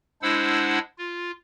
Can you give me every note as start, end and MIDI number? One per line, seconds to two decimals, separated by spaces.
0.22 0.79 56
0.22 0.79 62
0.22 0.79 64
0.22 0.79 72
0.22 0.79 78
0.22 0.79 88
0.98 1.32 65